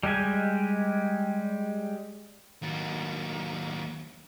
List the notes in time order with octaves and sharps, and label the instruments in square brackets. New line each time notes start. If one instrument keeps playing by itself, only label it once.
[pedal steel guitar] G3 G#3 G4 G#5
[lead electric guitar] D#2 F#3